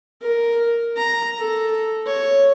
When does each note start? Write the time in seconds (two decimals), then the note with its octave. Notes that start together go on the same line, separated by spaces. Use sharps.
0.22 A#4
0.97 A#5
1.39 A4
2.06 C#5